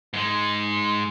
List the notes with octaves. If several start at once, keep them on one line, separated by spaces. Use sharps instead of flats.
G#2 G#3